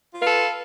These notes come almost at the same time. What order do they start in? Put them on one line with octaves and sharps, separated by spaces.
F4 F5 B4 A4